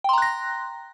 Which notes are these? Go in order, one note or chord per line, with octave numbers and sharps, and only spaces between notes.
G5 A#5 C6 F#6 A#6